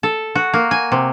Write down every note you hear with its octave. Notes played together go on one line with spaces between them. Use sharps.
A4
F#4
A#3
G#5
C3